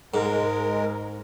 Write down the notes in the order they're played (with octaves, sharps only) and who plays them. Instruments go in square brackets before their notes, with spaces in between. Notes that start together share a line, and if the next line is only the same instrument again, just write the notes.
[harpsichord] G#2 [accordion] G#3 A#4